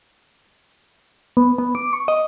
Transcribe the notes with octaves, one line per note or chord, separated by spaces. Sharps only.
B3
B3
D6
C#6
D#5